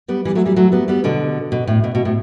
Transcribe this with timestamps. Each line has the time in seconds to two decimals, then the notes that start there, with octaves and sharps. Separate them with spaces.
0.08 G3 B3
0.25 E3 G3
0.35 F#3 A3
0.46 E3 G3
0.56 F#3 A3
0.72 G3 B3
0.88 G3 B3
1.04 B2 D3
1.52 B2
1.67 A2
1.84 B2
1.95 B2
2.05 A2